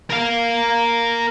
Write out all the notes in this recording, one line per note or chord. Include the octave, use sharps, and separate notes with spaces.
A#4 F5